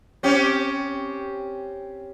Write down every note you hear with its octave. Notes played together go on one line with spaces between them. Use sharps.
C4 C#4 G4